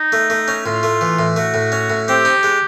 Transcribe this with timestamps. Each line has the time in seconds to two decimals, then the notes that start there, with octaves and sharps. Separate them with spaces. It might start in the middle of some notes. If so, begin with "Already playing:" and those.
Already playing: D#4
0.12 A3
0.30 A3
0.48 C#4
0.65 A2 F4
0.83 A3
1.01 E3
1.19 A2
1.36 A3 F#4
1.54 A2
1.72 C#4
1.90 A2
2.08 C4 G4
2.25 D#4
2.43 G#3